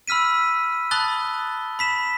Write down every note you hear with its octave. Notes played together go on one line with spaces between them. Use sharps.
B5 E6 F6 B6 D#7
A5 B5 D#6 F#6 A6 G7
B5 B6 E7